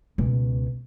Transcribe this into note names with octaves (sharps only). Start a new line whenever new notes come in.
C#2 B2